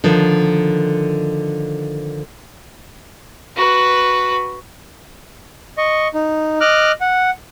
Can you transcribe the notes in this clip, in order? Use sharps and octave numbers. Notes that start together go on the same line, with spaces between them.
D3 D#3 F3
F#4 B4
D#5 C#6
D#4
D#5 D6 F6 F#6
F#5